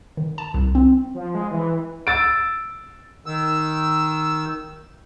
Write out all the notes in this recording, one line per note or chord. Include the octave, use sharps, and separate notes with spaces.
D#3
A5
C2
C4
F3
G#3
E3
E6 A6 D7
D#3 E6